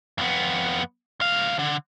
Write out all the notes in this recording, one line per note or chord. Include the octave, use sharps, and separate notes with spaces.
F2 B3
D2 F5
D3